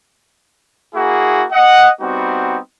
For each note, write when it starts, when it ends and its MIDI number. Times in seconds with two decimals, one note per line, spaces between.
0.95 1.46 58
0.95 1.46 64
0.95 1.46 66
0.95 1.46 68
1.52 1.90 75
1.52 1.90 78
2.01 2.59 55
2.01 2.59 59
2.01 2.59 60
2.01 2.59 63
2.01 2.59 66